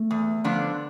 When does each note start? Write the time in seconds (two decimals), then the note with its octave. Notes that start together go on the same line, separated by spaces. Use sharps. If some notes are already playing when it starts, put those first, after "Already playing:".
Already playing: A3
0.11 E2
0.44 D3 F3 B3 D4